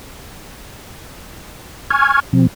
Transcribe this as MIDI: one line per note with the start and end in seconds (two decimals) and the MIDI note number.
1.91 2.20 80
1.91 2.20 85
1.91 2.20 89
1.91 2.20 92
2.33 2.47 47
2.33 2.47 53
2.33 2.47 60